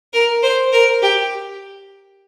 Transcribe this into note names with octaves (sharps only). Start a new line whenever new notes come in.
A#4
C5
A#4
G4